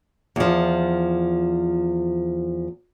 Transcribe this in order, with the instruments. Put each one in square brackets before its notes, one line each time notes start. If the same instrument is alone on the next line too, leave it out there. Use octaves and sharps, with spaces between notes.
[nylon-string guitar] E2 F3